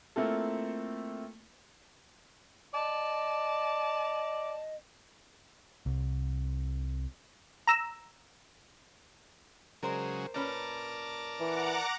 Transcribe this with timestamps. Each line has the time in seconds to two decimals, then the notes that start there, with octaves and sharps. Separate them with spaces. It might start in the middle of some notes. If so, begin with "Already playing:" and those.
0.16 A3 A#3 C4 E4 F4 A4
2.74 D5 D#5 A5
5.86 C2
7.67 A#5 E6
9.83 C#3 F#3 G#3 A#4 C5
10.34 A#2 C#4 A#4 B4 D5 A5
11.40 E3 F#5 A#5 D6